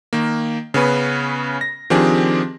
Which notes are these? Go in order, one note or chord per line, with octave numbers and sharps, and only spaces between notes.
D#3 A#3
C#3 B3 C#4 B4
A#6
D#3 F3 C4 D4 G4 G#4